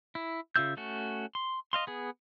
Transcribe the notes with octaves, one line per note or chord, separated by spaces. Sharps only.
E4
C#3 F4 E5 E6 G6
A3 C#4 F#4
C6
D#5 F5 C6
B3 G#4